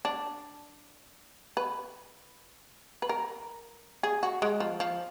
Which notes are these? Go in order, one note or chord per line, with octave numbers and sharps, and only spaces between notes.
D4
B4
B4
A#4
G#4
F#4
G#3
F3
F3